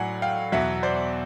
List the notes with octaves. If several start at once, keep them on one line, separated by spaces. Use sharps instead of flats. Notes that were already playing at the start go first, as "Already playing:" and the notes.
Already playing: A2 F#3 D5 F#5 G#5
F5 G5
E2 B2 F#3 E5 F#5
C5 D5